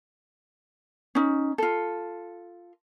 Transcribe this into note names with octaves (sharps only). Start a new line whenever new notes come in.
C#4 D#4
F4 A4